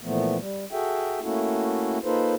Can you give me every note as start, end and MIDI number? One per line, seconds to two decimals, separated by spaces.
0.01 0.37 46
0.01 0.37 52
0.01 0.37 53
0.01 0.37 57
0.01 0.37 59
0.38 0.65 55
0.72 1.20 66
0.72 1.20 68
0.72 1.20 69
0.72 1.20 76
0.72 1.20 79
1.22 1.98 57
1.22 1.98 58
1.22 1.98 61
1.22 1.98 64
1.22 1.98 66
1.22 1.98 69
2.04 2.35 58
2.04 2.35 63
2.04 2.35 65
2.04 2.35 69
2.04 2.35 71
2.04 2.35 72